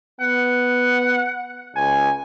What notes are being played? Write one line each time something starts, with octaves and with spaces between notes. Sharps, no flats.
B3 F#5
C#2 G#5